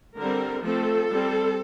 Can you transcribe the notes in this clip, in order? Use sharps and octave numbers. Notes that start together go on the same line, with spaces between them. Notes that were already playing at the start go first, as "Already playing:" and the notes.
D3 G3 C4 A#4
F3 A3 C4 A4
G3 C4